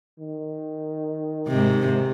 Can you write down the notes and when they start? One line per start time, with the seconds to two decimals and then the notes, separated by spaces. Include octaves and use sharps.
0.20 D#3
1.48 G#2 C3